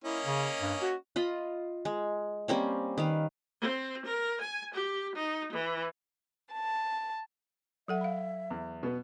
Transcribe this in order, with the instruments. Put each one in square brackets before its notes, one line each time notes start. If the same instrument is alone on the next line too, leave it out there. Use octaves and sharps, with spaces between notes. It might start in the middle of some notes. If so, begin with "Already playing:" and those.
[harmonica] A#3 C#4 D#5 [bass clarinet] E4
[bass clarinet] C#3
G2
F#4
[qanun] F4 D#5 B5
G#3
G3 A#3 C4 C#4
D#3 B4 F5
[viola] C4
A#4
G#5
G4
D#4
E3
[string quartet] A5
[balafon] F#3 A4 F#5 [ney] E5
[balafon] F5 B5
[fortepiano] E2
B2 B3